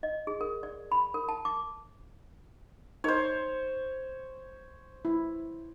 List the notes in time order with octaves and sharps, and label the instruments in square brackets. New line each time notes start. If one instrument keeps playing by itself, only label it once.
[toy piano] D#5
G#4
A#4
D5
B5
A#4
A5
D6
[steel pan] D#4 A#4 [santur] C5 C#5
[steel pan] E4